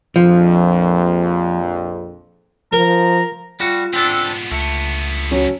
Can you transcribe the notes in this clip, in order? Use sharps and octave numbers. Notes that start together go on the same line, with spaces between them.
A#1 F2 F3
F3 A#4 A#5
G3 F4 F#4
G#2 B3 C4 D4 A4
C#2 D3 A3 B3
F#3 C#4 C#5